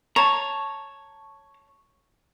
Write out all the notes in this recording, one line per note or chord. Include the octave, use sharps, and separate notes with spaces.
C#5 A5 A#5